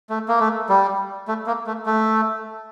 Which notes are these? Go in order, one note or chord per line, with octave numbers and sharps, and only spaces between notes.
A3
A#3
A3
G3
A3
A#3
A3
A3